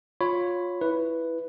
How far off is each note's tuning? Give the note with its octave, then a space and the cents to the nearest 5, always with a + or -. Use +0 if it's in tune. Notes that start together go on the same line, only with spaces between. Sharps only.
F4 +20 C#5 +0 B5 +10
E4 +0 B4 +0